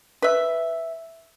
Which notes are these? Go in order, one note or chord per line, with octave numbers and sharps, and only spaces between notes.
B4 E5